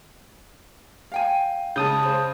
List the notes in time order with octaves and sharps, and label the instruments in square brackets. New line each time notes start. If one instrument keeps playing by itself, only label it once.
[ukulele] F5 G5 G#5
[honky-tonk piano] C#3 G#3 [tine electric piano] A5 D#6 G6
[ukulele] G#4 C5